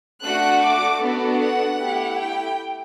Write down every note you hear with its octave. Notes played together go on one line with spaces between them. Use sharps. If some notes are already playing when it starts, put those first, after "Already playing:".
A3 D4 F#4 F#6
D6
B3 D4 F#4 A4
F#5
A3 E4 G4
G5